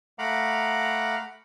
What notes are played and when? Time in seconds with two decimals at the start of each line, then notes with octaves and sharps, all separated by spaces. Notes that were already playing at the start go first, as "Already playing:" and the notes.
0.19 A3 F5 F#5 A#5 B5 D6